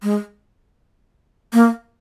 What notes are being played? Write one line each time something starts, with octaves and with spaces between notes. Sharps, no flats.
G#3
A#3